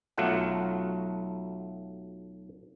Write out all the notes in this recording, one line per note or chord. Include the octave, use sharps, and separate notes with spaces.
B1 F#3 A3 F4 F#5